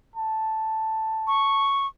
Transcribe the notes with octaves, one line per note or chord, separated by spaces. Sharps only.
A5
C#6